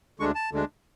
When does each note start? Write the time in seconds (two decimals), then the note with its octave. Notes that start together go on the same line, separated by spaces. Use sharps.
0.19 D2 D3 G#3 D4 C#6
0.35 A5
0.52 D2 D3 G#3 D4